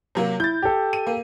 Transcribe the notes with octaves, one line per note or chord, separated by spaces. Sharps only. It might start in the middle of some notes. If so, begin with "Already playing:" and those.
C3 F#3 A#3
E4 G6 A6
G4 A4
D#7
A#3